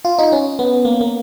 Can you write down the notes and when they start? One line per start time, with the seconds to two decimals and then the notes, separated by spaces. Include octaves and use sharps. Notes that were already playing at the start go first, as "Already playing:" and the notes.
0.05 F4
0.19 D#4
0.32 C#4
0.59 B3
0.85 A#3
1.01 A#3